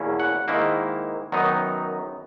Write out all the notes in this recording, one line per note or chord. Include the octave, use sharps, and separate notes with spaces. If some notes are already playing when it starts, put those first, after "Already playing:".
Already playing: E2 B2 A#3 C#4 E4
F#5
G#2 D#3 A#3 E4
F#2 D#3 F#3 B3 D#4